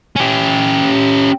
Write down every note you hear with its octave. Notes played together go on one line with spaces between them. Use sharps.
C#4 G4